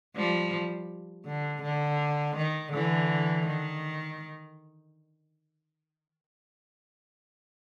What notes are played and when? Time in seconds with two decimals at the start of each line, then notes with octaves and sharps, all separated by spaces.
0.16 F3 G3
1.26 D3
1.63 D3
2.37 D#3
2.73 D3 E3
3.47 D#3